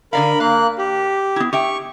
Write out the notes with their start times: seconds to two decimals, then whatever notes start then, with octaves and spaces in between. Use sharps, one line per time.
0.13 D3 A#4 D5 F5 B5
0.40 A#3 F5 F#6
0.78 G4
1.36 B3 E4
1.53 G4 E5 G5 C#6